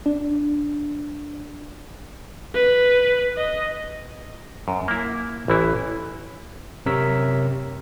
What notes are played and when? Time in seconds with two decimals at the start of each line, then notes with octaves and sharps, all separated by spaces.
0.06 D4
2.54 B4
3.37 D#5
4.68 F#2
4.88 A#3 E4
5.48 A1 E3 E4
6.86 F#2 C3 A#4 C#5 E6 B6